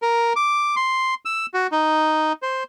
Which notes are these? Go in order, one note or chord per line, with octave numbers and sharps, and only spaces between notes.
A#4
D6
C6
E6
F#4
D#4
C5